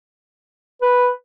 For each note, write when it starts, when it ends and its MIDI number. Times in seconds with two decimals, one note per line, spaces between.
0.82 1.09 71